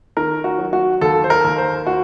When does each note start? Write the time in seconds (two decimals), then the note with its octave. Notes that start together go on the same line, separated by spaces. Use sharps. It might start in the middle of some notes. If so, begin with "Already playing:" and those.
0.17 D#3 A#4
0.44 F#4
0.59 F#3
0.73 F#4
1.01 D#2 A4
1.24 C5
1.30 A#4
1.44 D#2
1.58 C5
1.87 F#4